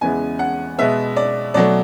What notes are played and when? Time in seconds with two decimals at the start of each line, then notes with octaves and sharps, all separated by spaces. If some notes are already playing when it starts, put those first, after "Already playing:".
0.01 E2 C#3 E3 G#3 B3 G#5
0.39 F#5
0.78 B2 G#3 B3 E5
1.16 D5
1.54 B2 F#3 A3 D5